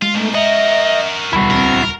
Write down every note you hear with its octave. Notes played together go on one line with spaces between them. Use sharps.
G#3 F4
B2 D#3 A3
F#4 A#4 D#5 E5
D#1 C#2 G3 E4 F#4
C4 A#4